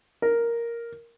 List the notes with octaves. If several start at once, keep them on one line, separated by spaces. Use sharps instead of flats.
A#4